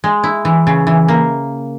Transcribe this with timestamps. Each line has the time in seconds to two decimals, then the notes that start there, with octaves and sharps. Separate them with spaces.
0.04 G#3
0.24 E4
0.45 E3
0.67 C#3
0.87 E3
1.08 A#3